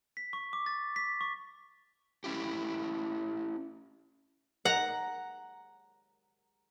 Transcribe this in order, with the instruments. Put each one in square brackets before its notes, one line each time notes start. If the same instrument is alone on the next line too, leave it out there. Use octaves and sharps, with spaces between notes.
[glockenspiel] B6
C#6
D6
A6
B6
C#6
[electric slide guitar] C#4 E4 G4
[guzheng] F#5 A#5